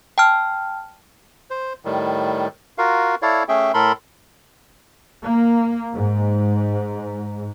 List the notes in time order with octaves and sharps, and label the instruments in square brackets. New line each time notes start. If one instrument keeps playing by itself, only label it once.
[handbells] G5 A5 F6
[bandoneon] C5
A2 D#3 G3
F4 F#4 A#4 F5
E4 A4 C#5 D5 F5
A3 C#4 G#4 E5 G5
A2 A4 A#4 B5 C6
[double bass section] A#3
G#2